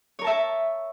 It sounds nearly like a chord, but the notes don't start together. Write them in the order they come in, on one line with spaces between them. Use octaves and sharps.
C#5 A#4 A5 E5